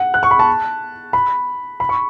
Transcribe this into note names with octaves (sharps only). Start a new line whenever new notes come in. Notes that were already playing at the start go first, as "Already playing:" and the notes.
Already playing: F#5
F#6
C#6
B5
A5
B5
B5
C#6